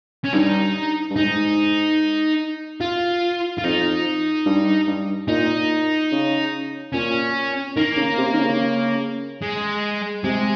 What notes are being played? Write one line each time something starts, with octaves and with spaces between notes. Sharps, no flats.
C#4
G2 D#4
G2
G#2 D#4
F4
F4
F2 D#4
G2
G2
A#2 D#4
C#3
A#2 C#4
D#3 A#3
C#3
C3
D#3
C#3
G#3
C3 G#3